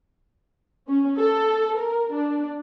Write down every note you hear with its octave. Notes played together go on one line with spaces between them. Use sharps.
C#4
A4
A#4
D4